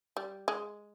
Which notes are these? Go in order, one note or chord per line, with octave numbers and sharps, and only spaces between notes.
G3
G#3